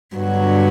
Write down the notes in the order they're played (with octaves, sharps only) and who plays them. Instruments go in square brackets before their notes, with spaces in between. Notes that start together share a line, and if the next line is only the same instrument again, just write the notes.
[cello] G2 [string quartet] D3 F#3 B3 F#4